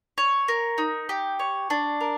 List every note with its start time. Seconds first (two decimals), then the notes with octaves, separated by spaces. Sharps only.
0.18 C#5
0.48 A#4
0.78 D#4
1.09 G4
1.39 C#5
1.70 D4
2.01 A#4